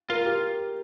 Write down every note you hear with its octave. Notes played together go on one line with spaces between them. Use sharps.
F4 A#4
G4